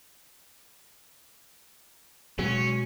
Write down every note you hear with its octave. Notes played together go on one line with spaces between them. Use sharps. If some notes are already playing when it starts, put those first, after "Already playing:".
B2 F#3 G#3 C#4